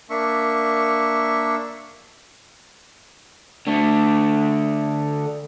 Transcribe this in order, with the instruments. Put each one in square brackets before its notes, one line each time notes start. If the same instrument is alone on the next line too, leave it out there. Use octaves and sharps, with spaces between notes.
[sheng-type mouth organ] A#3 D4 E5 C#6
[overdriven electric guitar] D3 A3